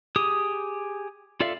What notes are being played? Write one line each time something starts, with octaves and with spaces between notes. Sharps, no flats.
G4 G#4 D#6
F4 A4 D5 E5 F5